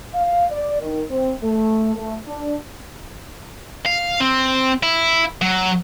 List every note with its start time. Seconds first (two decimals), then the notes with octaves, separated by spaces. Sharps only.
0.14 F5
0.50 D5
0.81 D#3
1.09 C4
1.42 A3
1.95 A3
2.26 D4
3.85 F5
4.20 C4
4.83 E4
5.42 F#3